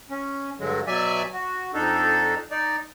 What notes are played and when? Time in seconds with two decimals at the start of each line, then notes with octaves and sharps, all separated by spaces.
0.10 C#4
0.59 G2 D3 F#3 G#3
0.87 B2 F#3 D5 E5 G#5
1.33 F#4
1.74 F2 D4 D#4 A4
2.51 D#4 D5